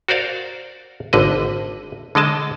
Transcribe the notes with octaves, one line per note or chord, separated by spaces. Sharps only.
F#4 A#4 C5 D5 F5
G#1 D3 B4 D#5
D3 G#3 D#5 A5